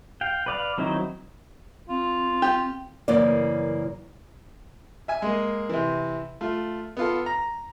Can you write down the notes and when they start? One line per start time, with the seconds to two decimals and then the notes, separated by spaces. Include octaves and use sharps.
0.21 F5 G5
0.46 B4 D5 F5
0.78 D#3 F#3 C4 D#4 E4
1.89 C4 F4
2.42 G4
3.08 F#2 C#3 E3 A#3 D5
5.08 E5 G#5
5.22 G#3 A#3
5.69 C3 E3
6.41 A3 F4
6.97 B3 F4 A4
7.26 A#5